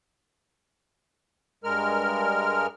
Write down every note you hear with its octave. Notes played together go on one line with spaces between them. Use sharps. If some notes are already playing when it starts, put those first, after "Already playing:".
G2 G#3 A#4 F6